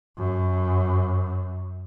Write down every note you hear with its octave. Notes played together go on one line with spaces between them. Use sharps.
F#2